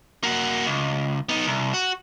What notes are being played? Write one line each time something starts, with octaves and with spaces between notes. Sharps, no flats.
A#3 F#4
C#2
B3 D#4
C2
F#4